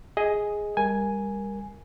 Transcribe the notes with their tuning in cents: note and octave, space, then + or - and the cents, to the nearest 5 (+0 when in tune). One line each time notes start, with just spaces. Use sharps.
G#4 +0 D#5 +10
G3 +30 A#4 +10 G#5 +0